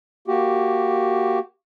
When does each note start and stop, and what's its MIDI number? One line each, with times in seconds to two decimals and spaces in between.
0.28 1.39 58
0.28 1.39 66
0.28 1.39 67